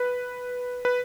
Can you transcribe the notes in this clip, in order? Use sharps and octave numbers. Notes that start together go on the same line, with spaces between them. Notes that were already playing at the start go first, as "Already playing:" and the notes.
Already playing: B4
B4